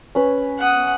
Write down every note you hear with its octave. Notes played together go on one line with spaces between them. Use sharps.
C#4 B4
F#5 D#6